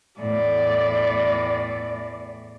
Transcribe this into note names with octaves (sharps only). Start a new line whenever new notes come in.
E2 A2 D5